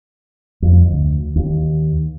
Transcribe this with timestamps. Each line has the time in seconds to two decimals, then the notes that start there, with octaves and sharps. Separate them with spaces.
0.62 F2
0.88 D2
1.36 D#2